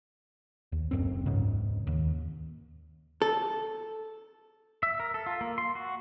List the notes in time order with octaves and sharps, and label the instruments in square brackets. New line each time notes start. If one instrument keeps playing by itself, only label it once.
[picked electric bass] D#2
F#1 F#2 C4
E1 C#2 G#2 C#3
D#2
[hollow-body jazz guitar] A4
[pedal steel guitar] E5
A#4
A4
F4
A#3
C6
F#4